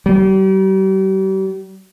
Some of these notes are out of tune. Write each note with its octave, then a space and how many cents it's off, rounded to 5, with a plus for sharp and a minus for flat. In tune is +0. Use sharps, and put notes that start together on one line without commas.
G3 -40